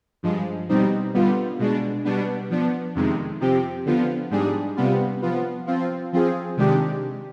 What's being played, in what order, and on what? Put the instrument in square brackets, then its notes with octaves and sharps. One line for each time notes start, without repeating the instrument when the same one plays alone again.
[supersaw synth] G2 F3 G#3
B2 G3 C4 D#4
D3 G3 B3 F4
B2 G#3 D4
B2 G3 B3 D4
F3 B3 D4
F2 C3 D#3 G#3
C3 F3 C4 G4
D3 F3 B3 F4
G#2 G3 D4 G#4
C3 G3 B3 F4
F3 B3 F4
F3 C4 F4
F3 C4 F4 G#4
C3 D#3 G#3 D4 G4